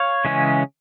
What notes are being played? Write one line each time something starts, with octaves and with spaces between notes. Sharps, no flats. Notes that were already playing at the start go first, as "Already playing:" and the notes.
Already playing: C#5 F5
C#3 E3 G#3 C#4